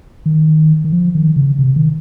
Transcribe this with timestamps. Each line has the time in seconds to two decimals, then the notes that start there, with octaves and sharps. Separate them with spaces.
0.26 D#3
0.84 D#3
0.92 F3
1.15 D#3
1.36 C#3
1.59 C3
1.76 D#3